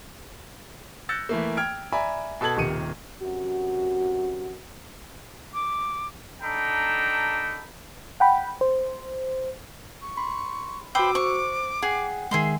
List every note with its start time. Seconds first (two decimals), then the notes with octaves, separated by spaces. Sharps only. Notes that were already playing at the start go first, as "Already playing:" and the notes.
1.09 E6 F#6 G6 A6 A#6 C#7
1.29 E3 A3 A#3
1.57 G5 F6 G#6 D7
1.92 D5 E5 G#5 A#5 B5
2.41 B2 A4 A5 G#6 F#7
2.57 D#1 C3 D#3 C#7 D#7
3.21 F#2 C3 F#4
5.54 D6
6.42 D4 D#4 A4 G5 A#5 B5
8.20 F#5 G5 B5
8.61 C5
10.02 C#6
10.17 B5 C6
10.95 F#4 B4 C5 G5 D6 E6
11.15 C5 C#6
11.83 G#4 F#5 G5
12.31 D#3 G#3 G#4 E5 C6